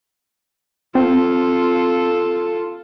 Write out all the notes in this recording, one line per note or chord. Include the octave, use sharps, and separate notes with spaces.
C4 F4 A4